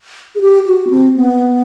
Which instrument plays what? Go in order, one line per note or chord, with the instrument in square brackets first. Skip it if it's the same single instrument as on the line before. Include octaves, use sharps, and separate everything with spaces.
[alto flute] G#4
G4
F#4
B3
C4
B3